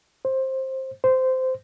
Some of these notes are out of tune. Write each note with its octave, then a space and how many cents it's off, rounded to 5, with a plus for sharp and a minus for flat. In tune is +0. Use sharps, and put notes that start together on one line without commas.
C5 +15
C5 -15